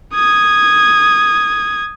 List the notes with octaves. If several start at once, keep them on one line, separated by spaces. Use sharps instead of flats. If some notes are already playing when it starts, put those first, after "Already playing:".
D#6 G#6